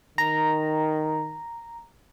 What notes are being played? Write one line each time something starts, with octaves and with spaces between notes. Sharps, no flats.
D#3 A#5